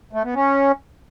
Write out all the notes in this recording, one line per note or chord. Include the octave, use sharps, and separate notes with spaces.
A3
B3
C#4